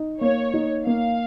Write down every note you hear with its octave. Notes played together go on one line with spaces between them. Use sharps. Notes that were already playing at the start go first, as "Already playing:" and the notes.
Already playing: D#4
A#3 C#5
D#4
A#3 F5